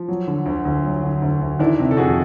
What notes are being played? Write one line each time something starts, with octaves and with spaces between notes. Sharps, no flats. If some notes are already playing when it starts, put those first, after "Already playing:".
Already playing: F3
F#3
D3
D2
D2
F#3
D3
D2
D2
D#3 D4 E4
C3
A4
F2 F#4 G#4